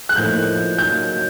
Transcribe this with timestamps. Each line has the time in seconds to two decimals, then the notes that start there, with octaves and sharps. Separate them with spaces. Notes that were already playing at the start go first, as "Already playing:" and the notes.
0.09 F#6
0.16 A2 F3 A#3 D#4 G6
0.78 C#3 F#3 A#3 D#4 G6